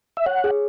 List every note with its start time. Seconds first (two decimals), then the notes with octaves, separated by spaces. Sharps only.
0.17 E5
0.26 C#5 F#5
0.44 G#4